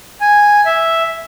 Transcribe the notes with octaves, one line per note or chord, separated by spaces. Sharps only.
G#5
E5